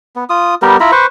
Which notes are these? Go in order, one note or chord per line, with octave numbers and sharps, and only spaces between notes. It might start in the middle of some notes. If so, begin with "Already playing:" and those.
B3
F4 D#6
G3 B3 G4 A#4
E4 F4 A#5 B5
B4 C5 C#6